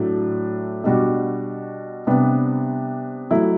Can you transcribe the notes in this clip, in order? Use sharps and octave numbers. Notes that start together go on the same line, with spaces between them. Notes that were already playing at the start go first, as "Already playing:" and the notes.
Already playing: A2 F#3 A3 D4
B2 G3 D4 F#4
C3 G3 B3 D4
F#3 A3 E4